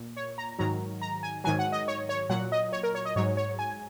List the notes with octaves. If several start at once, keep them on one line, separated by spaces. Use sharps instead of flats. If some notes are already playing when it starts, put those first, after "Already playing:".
Already playing: A#2
C#5
A#5
G#2 D#3 F#3 A#5
A#5
G#5
G#2 D#3 F#3 G#5
F#5
D#5
C#5
C#5
A#2 F#3 F#5
D#5
C#5
A#4
C#5
D#5
G#2 F#3 C#5
C#5
G#5